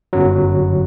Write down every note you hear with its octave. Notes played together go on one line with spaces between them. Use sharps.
G1 F#2 F#3